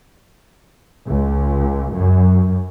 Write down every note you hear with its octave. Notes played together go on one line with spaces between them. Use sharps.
C#2
F#2